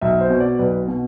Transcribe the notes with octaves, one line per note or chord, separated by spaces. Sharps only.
B1 E5
C5
B2
D5
B1 B4
B2